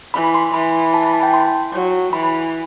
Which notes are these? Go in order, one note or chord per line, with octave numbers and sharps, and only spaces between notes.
E3 B5
C6
E3 B5
A5
B5
A5
G5
C6
F#3
E3 B5